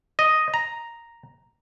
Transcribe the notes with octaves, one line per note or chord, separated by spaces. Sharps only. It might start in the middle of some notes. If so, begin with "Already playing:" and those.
D#5
A#5